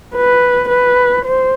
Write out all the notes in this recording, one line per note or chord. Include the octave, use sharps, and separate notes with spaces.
B4
B4
C5